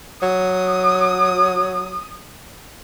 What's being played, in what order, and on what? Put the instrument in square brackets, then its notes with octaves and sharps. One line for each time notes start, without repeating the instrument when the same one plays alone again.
[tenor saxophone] F#3 [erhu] D#6